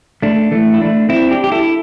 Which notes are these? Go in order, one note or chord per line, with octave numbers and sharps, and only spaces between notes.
A3 D4
E3 A3
E4
A3 D4
C4 E4
D4 G4
G4
E4 A4